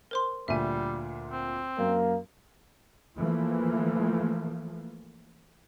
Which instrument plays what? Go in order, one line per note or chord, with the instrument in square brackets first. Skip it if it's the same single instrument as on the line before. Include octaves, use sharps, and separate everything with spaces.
[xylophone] A#4 C5 C6
[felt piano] D2 A#2 [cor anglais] G3 [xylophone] E5 G#5
[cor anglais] C4
[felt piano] F#2 [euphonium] A#3
[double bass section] E3 F3 A3 A#3